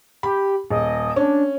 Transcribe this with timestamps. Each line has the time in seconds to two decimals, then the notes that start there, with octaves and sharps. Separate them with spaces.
0.23 G4 B5
0.70 D#1 D#5
1.16 C#4 D4